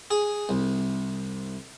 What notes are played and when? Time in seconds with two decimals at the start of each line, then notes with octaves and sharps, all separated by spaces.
0.11 G#4
0.49 C2